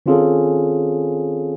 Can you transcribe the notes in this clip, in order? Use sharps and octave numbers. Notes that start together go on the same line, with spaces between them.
D#3 C4 C#4 F4 G#4 A4